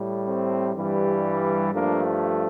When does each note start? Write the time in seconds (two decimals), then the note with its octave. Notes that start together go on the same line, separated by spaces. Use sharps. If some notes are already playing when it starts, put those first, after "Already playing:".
Already playing: A2 G3
0.26 A3 C4
0.75 G2 E3 G3
1.72 G2 F3 A3 A#3 D4